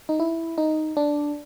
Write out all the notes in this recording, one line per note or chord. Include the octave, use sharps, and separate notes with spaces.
D#4
E4
D#4
D4